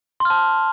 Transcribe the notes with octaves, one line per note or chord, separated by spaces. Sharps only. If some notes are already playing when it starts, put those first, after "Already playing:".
A5 C6 F6